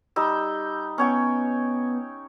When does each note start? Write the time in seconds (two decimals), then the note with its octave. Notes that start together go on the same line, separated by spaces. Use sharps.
0.16 G3 D#4 E6 G6
0.98 B3 C#4 C#5 G5